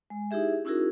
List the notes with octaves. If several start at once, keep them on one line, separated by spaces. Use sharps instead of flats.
G#3
D#4 E4 G4 G#4 E5
C#4 D#4 E4 F#4 G#4 A#4